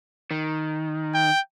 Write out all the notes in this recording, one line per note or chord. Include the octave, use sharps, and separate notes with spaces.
D#3
G5